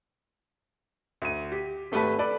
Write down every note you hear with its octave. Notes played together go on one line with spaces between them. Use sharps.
D2 D#7
G4
G#1 A3 G4 B4 A5
A4 B4 D5 B5